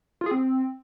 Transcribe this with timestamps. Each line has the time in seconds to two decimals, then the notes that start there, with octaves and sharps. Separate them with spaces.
0.21 F4
0.26 G#4
0.31 C4